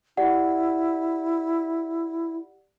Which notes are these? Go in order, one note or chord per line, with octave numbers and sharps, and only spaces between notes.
E4 G4 D5 F#5